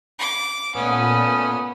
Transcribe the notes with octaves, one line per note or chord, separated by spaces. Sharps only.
D6
A#2 A3 B3 C#4 D#6